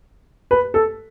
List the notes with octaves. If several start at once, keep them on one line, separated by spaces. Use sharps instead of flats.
B4
A4